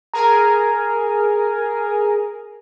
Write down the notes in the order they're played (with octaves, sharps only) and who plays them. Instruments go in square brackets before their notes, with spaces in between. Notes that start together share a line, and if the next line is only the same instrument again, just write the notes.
[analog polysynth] G#4 A#4 G#5 [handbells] A#5